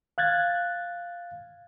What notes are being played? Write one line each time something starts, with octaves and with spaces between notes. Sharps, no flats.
F5 F#6 G#6 A6